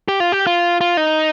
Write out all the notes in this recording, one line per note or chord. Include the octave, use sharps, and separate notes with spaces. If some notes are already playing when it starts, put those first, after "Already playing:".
G4
F4
G4
F4
F4
D#4